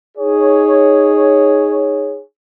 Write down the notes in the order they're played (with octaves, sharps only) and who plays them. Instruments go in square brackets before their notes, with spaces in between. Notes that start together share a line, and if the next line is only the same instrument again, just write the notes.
[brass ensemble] D#4 G#4 C#5